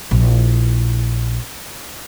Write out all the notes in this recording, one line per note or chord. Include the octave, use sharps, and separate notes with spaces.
A#1 E4